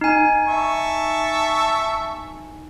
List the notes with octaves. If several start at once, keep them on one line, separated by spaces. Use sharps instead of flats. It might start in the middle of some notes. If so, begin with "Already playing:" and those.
D#4 G#5
E5 A5 C#6